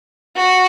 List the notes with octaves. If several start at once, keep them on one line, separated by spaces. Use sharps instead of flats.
F#4